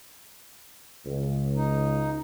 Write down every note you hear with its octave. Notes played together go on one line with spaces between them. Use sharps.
C#2
D#4